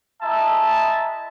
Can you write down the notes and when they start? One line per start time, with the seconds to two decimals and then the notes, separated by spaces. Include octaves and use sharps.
0.22 G#3 E4 D#5 E5 A5 A#5